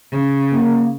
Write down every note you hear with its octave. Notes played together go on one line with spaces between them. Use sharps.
C#3
A#3